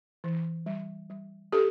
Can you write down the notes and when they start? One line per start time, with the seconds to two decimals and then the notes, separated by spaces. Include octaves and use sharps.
0.24 E3
0.66 G3
1.10 G3
1.52 D4 G4 A4